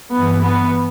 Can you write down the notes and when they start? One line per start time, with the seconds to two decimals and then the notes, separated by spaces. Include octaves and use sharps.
0.12 G2 E3 B3
0.43 B3